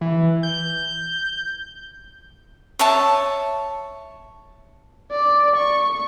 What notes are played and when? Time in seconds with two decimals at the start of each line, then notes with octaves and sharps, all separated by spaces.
0.01 E3
0.43 G6
2.79 C#5 E5 A5
5.12 D5
5.56 C#6